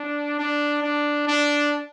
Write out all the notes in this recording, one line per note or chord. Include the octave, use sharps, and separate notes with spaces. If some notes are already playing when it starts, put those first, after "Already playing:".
Already playing: D4
D4
D4
D4